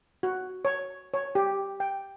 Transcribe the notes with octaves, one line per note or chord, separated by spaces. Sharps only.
F#4
C#5
C#5
G4
G5